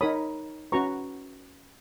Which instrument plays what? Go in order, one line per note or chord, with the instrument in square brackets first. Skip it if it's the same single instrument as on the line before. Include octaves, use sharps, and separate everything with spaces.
[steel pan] D#4 A#4 C#5 B5 D#6
C#4 F#4 B4 A#5 C#6